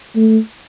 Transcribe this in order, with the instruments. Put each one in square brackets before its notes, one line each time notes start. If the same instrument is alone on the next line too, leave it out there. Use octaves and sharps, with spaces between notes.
[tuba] A3